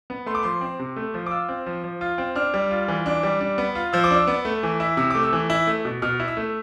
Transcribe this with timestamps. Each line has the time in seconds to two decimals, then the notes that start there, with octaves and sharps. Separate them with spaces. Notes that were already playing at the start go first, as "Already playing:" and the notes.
0.10 B3
0.26 A3 C6
0.35 D6
0.43 F3 C6
0.61 C4
0.79 C3
0.96 A3
1.14 F3
1.27 D6
1.31 F4 E6
1.49 C4
1.66 F3
1.84 F3
2.01 F4
2.18 C4
2.36 D4 F6
2.54 G3
2.71 F4
2.88 E3
3.06 D4
3.23 G3
3.41 D4
3.58 B3
3.75 F4
3.93 F3 E6
4.04 D6
4.11 D4 E6
4.27 B3
4.45 A3
4.63 E3
4.80 E4
4.97 C3 E6
5.10 A3 D6
5.23 E6
5.33 E3
5.50 E4
5.67 A3
5.85 B2
6.02 B2 F6
6.20 E4
6.28 E6
6.37 A3